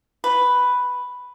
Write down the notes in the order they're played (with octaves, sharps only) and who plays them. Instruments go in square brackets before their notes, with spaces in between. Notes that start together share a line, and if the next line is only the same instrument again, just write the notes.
[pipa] B4